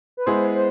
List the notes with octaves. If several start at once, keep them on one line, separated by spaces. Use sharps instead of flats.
B4
G#3 B3 E4 G#4 C5
C5